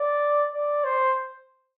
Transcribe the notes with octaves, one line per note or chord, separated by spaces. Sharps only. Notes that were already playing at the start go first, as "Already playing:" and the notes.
Already playing: D5
D5
C5